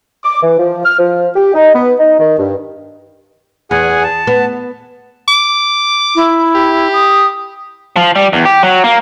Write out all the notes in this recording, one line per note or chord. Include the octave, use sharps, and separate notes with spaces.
D6
E3
F3
F6
F3
G4
D#4
B3
D#4
D#3
G2
E2 G#4 F#5 G#5
A5
B3
D6
E4
G4
D#6
F3
G3
E2
G4
F#3
A#3